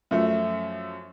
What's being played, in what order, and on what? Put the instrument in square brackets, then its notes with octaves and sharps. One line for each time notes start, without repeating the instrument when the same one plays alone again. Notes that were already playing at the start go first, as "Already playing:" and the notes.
[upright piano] F#2 F3 A3